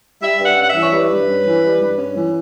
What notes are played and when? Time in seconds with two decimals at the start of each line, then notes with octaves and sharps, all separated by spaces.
0.21 G3 E5
0.39 G2
0.45 F#5
0.57 C#4
0.62 F#5
0.69 E5
0.75 E3
0.82 C#5
0.92 G3 B4
1.10 G2
1.28 C#4
1.45 E3
1.63 G3
1.81 G2
1.98 C#4
2.16 E3